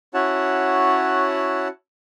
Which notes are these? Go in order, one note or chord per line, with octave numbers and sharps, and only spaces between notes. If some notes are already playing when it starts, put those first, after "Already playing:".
C#4 E4 F#4 C#5 F#5 A5